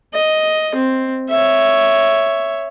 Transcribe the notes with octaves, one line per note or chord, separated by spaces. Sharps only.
D#5
C4
C#5 E5